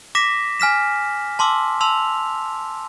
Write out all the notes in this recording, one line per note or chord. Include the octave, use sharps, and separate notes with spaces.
D6 A#6 B6 E7
G#5 F6 B6 E7
A5 C6 D6 E6
A5 C6 E6 F7